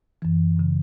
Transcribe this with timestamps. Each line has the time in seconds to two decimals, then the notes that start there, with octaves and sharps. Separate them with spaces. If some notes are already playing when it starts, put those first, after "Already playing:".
0.22 F#2 E3
0.57 F#2 C#3 E3